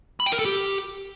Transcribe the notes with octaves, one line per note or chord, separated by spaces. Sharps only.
B5
G5
A#4
A4
G4